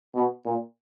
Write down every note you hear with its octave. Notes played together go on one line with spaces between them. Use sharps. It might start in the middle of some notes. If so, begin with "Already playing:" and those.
B2
A#2